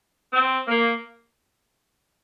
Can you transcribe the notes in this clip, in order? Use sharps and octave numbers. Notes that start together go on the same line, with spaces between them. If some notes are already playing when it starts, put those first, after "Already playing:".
C4
A#3